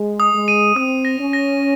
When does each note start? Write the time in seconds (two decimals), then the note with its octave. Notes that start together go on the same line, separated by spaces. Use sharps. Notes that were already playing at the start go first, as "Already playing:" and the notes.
Already playing: G#3
0.20 D#6
0.34 G#3
0.48 D#7
0.76 C4 D#6
1.05 A#6
1.19 C#4
1.33 A#6